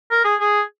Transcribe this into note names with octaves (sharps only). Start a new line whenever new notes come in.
A#4
G#4
G#4